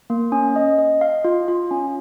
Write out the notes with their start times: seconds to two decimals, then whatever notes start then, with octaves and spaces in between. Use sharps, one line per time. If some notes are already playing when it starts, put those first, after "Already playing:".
0.10 A#3
0.32 C#4
0.56 D#5
0.79 D#5
1.01 F5
1.24 F4
1.48 F4
1.71 C#4